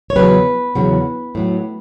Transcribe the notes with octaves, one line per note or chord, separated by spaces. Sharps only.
C#5
E2 C#3 F#3 B4
E2 C#3 F#3
A2 F#3